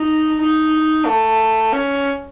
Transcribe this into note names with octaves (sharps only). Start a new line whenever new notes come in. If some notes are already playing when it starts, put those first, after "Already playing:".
Already playing: D#4
D#4
A3
C#4